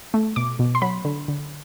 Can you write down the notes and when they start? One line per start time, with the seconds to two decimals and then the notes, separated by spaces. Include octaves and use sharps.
0.14 A3
0.36 B2 D6
0.59 B2
0.75 C6
0.82 F#3 B5
1.05 D3
1.28 D3